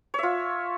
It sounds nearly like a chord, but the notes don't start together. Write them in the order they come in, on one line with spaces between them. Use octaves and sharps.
C#5 E5 F4